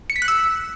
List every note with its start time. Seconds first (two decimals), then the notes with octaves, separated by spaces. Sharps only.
0.10 C#7
0.16 B6
0.22 F#6
0.28 E6